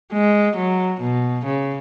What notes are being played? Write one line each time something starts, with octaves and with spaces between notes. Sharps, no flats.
G#3
F#3
B2
C#3